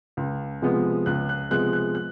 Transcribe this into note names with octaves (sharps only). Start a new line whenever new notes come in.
C#2
C3 F3 G#3 B3
C#2 F#6
F#6
C3 F3 G#3 B3 F#6
F#6
F#6